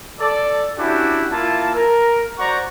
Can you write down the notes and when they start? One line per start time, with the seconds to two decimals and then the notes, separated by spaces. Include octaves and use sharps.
0.20 A4 D5
0.78 C#4 D4 E4 F#4 G4
1.31 A#3 E4 F4 A5
1.75 A#4
2.39 F#4 C5 D5 F#5 A#5 C#6